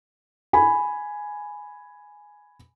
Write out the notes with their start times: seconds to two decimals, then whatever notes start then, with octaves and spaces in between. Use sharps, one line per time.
0.53 G#5 B5